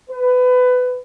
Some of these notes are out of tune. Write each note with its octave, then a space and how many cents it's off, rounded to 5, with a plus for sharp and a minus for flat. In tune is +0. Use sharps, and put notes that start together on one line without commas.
B4 +20